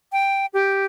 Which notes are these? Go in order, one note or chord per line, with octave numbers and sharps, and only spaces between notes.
G5
G4